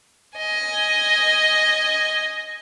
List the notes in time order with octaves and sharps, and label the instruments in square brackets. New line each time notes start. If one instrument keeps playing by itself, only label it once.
[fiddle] D#5 G#5